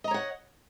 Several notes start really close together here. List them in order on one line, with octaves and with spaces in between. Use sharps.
D#5 A#5 C#5 F#5